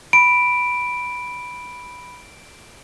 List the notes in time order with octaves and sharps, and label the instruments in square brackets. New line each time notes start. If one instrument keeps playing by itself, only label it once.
[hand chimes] B5 [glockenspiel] D7